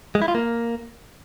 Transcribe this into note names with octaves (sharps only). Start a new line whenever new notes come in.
G#3
E4
F4
A#3